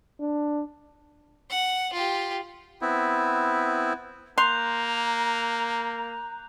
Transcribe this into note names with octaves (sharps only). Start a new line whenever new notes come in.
D4
F#5
F4 G4
B3 C4 E4
A#3 A#5 C6 F#6 G6 F7